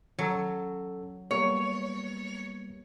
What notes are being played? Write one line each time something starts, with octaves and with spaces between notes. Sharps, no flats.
F#3 C#4 A4 E6
G3 A#3 B3 C#5